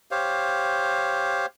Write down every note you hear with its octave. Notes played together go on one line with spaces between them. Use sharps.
G4 C5 C#5 F5